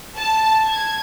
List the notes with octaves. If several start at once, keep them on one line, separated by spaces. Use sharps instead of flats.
A5
G#6